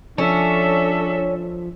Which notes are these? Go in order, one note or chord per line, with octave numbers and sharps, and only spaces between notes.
F3 C#4 D4 A4 E5